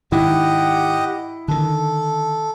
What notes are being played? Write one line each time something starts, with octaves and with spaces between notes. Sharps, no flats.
G#2 D#3 E4 G4 D#5 F#5
D3 D#3 A4